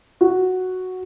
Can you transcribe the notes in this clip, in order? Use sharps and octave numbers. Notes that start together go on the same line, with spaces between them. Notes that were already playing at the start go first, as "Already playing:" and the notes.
F#4